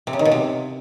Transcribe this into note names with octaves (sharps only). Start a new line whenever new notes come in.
C3
C#3
D#3
B2
C3